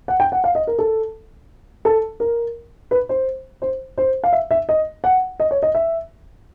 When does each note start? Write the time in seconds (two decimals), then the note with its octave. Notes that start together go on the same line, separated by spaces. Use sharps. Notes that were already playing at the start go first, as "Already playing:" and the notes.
0.08 F#5
0.20 G5
0.32 F#5
0.44 F5
0.55 D#5
0.67 A#4
0.79 A4
1.85 A4
2.20 A#4
2.91 B4
3.09 C5
3.62 C5
3.98 C5
4.24 F5
4.33 E5
4.51 E5
4.69 D#5
5.04 F#5
5.40 D#5
5.51 C#5
5.63 D#5
5.75 E5